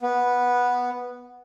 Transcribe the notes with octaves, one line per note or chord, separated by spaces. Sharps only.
B3